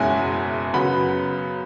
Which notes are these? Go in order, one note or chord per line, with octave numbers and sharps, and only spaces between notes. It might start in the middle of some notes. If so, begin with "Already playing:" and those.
Already playing: F#1 E2 B2 G#3 C#4 E5 G#5
F#2 C#3 F#3 B3 F#5 B5